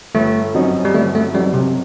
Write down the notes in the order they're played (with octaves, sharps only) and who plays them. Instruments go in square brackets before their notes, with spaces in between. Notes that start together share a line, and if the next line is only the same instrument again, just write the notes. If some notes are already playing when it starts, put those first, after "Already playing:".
[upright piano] G1 [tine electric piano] A3
[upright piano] F#2 F#3 C4 D#4
[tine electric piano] G3
[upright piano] G1 [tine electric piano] A3
[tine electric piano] A3
[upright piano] F#2 F#3 C4 D#4 [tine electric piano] G3
[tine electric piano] C3